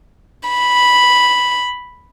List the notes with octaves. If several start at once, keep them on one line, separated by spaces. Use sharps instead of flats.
B5